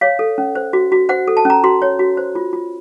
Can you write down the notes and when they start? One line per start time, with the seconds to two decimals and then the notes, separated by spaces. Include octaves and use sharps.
0.01 C#5 F5
0.19 A4
0.38 C#4
0.55 C5
0.73 F#4
0.92 F#4
1.09 C5 F#5
1.28 A4
1.37 A5
1.45 C#4 A#5
1.63 F#4 C6
1.82 C#5
1.99 F#4
2.17 C5
2.35 F4
2.53 F4